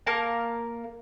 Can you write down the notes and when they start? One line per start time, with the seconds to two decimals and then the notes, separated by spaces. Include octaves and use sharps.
0.07 A#3 A#4 F5 A5